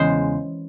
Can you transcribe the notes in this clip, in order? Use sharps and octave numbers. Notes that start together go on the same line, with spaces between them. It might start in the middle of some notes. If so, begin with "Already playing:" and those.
Already playing: E2 C#3 G#3 C5